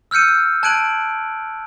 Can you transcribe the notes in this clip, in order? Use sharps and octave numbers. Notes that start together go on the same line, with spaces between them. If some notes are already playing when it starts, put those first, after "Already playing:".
E6 F6 G6 C#7 D#7
A5 F#6 G#6 D7 D#7 F#7